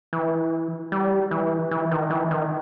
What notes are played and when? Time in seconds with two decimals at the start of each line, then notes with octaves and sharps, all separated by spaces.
0.13 E3
0.92 G3
1.31 E3
1.71 E3
1.91 D#3
2.10 E3
2.31 D#3